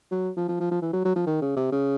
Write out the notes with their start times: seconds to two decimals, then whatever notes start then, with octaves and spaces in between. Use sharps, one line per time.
0.11 F#3
0.37 F3
0.48 F3
0.60 F3
0.71 F3
0.82 E3
0.93 F#3
1.05 F#3
1.16 F3
1.27 D#3
1.42 C#3
1.57 C3
1.72 C#3